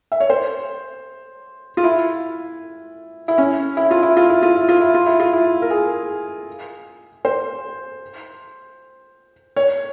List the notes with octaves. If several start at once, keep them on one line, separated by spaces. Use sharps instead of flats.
E5
C#5
C5
F4
E4
E4
C#4
E4
F4
E4
F4
E4
F4
E4
F4
E4
F4
E4
F4
E4
A#4
G#4
C5
C#5